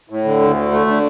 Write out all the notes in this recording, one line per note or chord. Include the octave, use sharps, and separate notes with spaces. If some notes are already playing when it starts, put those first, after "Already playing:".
A2
D3
D2
D3
A3
D3